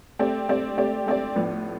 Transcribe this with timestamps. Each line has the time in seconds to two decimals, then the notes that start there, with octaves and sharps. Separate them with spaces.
0.19 A3 C4 G4 D5
0.48 A3 C4 G4 D5
0.77 A3 C4 G4 D5
1.06 A3 C4 G4 D5
1.36 A2 F3 B3 D4